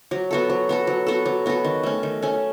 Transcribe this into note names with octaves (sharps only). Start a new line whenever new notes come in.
F#3
B3 F#4 A4
F#3
B3 F#4 A4
F#3
B3 F#4 A4
F#3
B3 F#4 A4
D#3
A3 C#4
D#3
A3 C#4